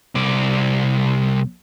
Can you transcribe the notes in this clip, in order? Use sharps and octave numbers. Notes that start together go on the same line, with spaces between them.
C2 D5